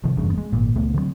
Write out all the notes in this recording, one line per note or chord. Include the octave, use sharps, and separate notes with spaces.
C3 D#3 F3
F#1 E2 G2 C#3
G#3 B3
G#1 A#2
C#2 A3 B3
D3 F#3 G3 C4